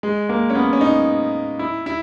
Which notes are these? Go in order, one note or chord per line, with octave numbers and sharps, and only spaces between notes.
G#3
A#3
C#4
B3
C#4
D#4
E4
E4